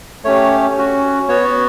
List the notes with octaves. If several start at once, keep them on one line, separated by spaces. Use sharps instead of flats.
A3 C#4 G4 C#5
C#4 F#4
B3 F#4 C#5